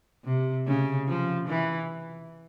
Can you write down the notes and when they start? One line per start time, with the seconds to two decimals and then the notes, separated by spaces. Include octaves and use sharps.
0.24 C3
0.67 C#3
1.08 F3
1.48 E3